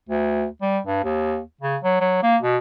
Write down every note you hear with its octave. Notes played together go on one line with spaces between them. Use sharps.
D2
G3
G2
D#2
C#3
F#3
F#3
A#3
B2